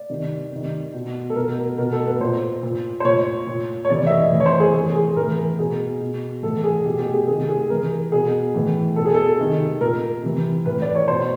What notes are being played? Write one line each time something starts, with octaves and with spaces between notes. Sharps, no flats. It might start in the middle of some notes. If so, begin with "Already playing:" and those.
Already playing: D5
C3 D#3
C3 D#3
B2
A4
B2 A#4
A#4
B2 A#4
A4
B4
A#2 C5
A#2
C5
A#2 C#5
A#2
C#5
C3 E3 D5
E5
D#5
A2 E3
C#5
C5
G#4
C3 E3 G#4
G#4
A2 E3 A#4
B2 G#4
B2
A2 E3 A4
G#4
B2 G4
G4
G#4
C3 D#3 G#4
G#4
C3 E3 A#4
B2 G#4
A2 E3
B2 A4
G#4
A4
C3 D#3
A#2 A#4
C3 E3
A2 E3 B4
D5
C#5
B2 C5